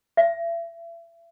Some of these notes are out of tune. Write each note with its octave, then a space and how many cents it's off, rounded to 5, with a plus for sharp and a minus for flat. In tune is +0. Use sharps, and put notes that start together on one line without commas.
E5 +35